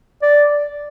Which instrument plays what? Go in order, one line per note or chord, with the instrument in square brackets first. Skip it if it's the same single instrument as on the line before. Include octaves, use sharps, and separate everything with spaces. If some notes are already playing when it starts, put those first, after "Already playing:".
[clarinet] D5